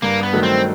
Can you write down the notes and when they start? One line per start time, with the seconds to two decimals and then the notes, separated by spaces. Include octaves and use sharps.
0.02 G2 A#3
0.23 B3
0.33 D#3 F#3 A3
0.43 C4